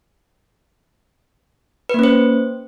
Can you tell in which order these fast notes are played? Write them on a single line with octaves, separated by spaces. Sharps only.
B4 A#3 C#4 C5